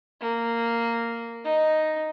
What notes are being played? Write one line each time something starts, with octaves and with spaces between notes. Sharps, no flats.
A#3
D#4